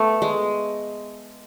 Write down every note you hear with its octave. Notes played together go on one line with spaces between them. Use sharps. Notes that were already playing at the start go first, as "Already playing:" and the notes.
Already playing: A3 B3
G#3